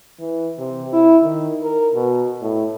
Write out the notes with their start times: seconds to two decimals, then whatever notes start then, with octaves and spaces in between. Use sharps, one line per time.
0.19 E3
0.59 C3
0.93 E4
1.23 D#3
1.62 A#4
1.95 B2
2.41 A2